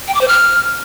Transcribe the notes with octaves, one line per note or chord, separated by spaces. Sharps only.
G5
D6
C5
F6